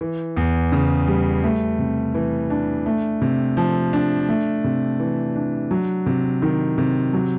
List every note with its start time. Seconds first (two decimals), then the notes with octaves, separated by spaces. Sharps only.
0.01 E3
0.37 E2
0.72 C#3
1.08 G3
1.44 A3
1.79 C3
2.14 E3
2.50 D4
2.86 A3
3.21 C3
3.57 F3
3.93 D4
4.29 A3
4.64 C3
5.00 E3
5.36 D4
5.71 F#3
6.06 C3
6.42 D#3
6.78 C3
7.13 F#3